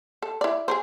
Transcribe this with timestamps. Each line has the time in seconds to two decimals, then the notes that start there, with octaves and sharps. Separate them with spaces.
0.22 A4
0.41 E4 D5
0.68 G#4 A#4 C5